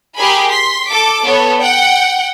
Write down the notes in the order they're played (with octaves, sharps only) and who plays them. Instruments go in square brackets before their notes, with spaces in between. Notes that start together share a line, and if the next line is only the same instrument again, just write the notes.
[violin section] G4 G#4 A#4 G#5 B5
C6 B6
A4 D6
B3 A4 C#5
F#5 G5